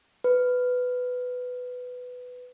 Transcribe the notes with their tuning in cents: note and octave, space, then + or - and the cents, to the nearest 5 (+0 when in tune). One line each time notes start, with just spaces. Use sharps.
B4 +10